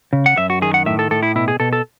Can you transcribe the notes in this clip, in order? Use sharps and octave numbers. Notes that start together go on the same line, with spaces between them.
C#3
F#5
F#2 E5
F#4
D#3 G#4
F#5
A2 E5
A4
A2 A4
E4
B2 E4
G#4
B2 A4
A4